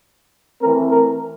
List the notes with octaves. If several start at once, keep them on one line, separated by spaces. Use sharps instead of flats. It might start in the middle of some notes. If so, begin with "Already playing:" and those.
E3 A3 C4 A#4
A#4